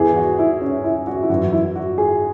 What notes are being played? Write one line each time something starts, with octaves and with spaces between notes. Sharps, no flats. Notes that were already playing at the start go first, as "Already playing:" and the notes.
Already playing: E2 E3 G#4
F#4
E4
C#4
E4
F#4
E4
F#2 E3 F#4
E4
F#4
G#4